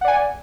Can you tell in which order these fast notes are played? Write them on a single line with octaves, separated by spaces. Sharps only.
F#5 D5 G#5